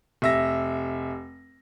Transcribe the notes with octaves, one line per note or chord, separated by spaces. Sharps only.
F1 E5 A#6